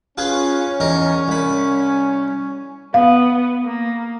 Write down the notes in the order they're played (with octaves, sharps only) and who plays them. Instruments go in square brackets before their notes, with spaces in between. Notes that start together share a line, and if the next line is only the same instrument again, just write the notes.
[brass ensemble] C#4 [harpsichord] F4 G#4 B4
[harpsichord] E2 D#4 A#4
C2 B5
[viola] B3 [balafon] F5
[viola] A#3